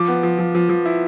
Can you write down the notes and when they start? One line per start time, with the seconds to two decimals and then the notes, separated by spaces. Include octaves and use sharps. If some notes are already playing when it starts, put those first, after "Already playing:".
Already playing: F3 D6
0.08 B3
0.23 F3
0.39 F3
0.55 F3
0.69 F3
0.85 E4